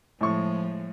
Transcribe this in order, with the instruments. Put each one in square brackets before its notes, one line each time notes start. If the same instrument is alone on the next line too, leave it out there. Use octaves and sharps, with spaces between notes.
[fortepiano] A2 C#6 [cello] F3 G#3